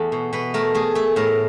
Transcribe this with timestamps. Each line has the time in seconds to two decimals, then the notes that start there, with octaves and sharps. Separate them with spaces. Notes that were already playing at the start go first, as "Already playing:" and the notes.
Already playing: E2 E3 A3
0.12 B2
0.33 B2 B4
0.54 A3 A#4
0.75 A3 G#4
0.95 A3 A4
1.16 A2 A#4